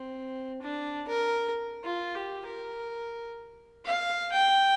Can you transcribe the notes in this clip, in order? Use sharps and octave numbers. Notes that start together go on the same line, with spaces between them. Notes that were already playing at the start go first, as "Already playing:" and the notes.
Already playing: C4
D4
A#4
F4
G4
A#4
F5
G5